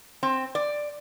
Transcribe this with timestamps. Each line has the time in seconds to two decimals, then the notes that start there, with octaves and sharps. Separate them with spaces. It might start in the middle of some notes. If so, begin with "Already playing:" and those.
0.23 C4
0.55 D5